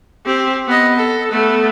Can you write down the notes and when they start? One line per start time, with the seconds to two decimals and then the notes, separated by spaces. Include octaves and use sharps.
0.26 C4 G4
0.67 B3 D#5
0.97 A4
1.31 A3 B3